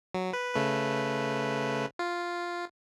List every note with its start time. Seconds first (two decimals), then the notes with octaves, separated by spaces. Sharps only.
0.15 F#3
0.33 B4
0.54 C#3 A3 B4
1.99 F4